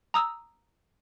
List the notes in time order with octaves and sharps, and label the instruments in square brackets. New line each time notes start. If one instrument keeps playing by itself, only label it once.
[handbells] A#5 D#6 E6